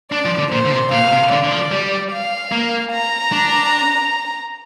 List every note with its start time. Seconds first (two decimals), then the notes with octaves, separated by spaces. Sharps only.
0.12 D4 D5
0.25 F3
0.38 D3
0.52 A#2 C5
0.65 D3
0.72 C3
0.92 A#2 F5
1.13 C3
1.32 D3 D5
1.44 D3
1.52 F3
1.72 G3
2.13 F5
2.52 A#3
2.92 A#5
3.32 D4